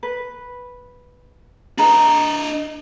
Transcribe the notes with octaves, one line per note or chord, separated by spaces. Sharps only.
B4
D4 G#4 B4 D#5 A#5